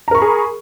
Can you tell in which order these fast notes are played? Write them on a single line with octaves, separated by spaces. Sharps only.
A#5 A#4 C#6 B5 G#4